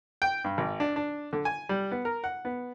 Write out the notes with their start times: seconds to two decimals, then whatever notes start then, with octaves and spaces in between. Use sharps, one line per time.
0.22 G5
0.44 G2
0.58 G#1
0.80 D4
0.96 D4
1.33 D3
1.45 G#5
1.69 G3
1.91 B3
2.05 A#4
2.24 F#5
2.45 B3